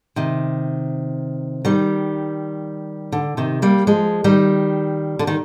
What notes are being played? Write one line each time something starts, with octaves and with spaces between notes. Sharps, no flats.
C3 D#3
D#3 G3
D3
C3 D#3
G3 A#3
F3 G#3
D#3 G3
D3
D#3